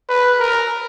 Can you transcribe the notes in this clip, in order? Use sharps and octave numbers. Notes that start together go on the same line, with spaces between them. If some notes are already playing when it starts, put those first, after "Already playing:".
B4
A#4